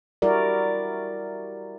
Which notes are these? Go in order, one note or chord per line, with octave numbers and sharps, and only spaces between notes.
G3 E4 F#4 A#4 D5